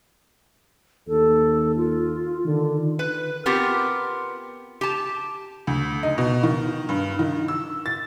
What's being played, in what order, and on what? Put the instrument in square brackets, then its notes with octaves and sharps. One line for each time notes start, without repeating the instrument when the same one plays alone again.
[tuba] D#2 [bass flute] A4
[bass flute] F4
[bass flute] D3 [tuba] D#3
[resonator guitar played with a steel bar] B4
B3 C4 F4 G4 A#4
G4 A5
[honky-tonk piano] D2
D#4
B2
D#3
G2
D#3
E6
A6